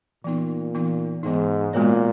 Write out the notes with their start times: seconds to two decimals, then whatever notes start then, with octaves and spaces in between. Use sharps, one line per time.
0.24 A#2 E3 B3 D#4
0.75 E3 B3 D#4
1.23 G#2 E3 B3 D#4
1.73 A#2 G#3 B3 F#4 A#4 C#5